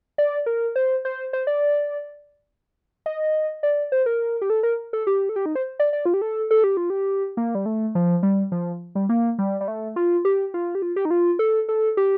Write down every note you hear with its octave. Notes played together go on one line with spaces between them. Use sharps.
D5
A#4
C5
C5
C5
D5
D#5
D5
C5
A#4
G4
A4
A#4
A4
G4
A4
G4
D#4
C5
D5
D5
F4
G4
A4
A4
G4
F4
G4
A#3
G3
A3
F3
G3
F3
G3
A#3
G3
G3
A3
F4
G4
F4
G4
F4
G4
D#4
F4
A4
A4
G4